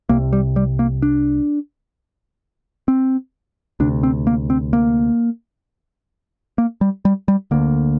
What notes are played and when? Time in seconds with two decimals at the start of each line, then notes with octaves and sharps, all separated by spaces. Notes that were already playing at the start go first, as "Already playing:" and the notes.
0.09 C2 C3 A#3
0.33 G3
0.56 G3
0.79 A#3
1.02 D4
2.88 C4
3.80 D2 C3 D4
4.03 C4
4.27 A#3
4.50 C4
4.73 A#3
6.58 A#3
6.81 G3
7.05 G3
7.28 G3
7.51 D2 D3 A#3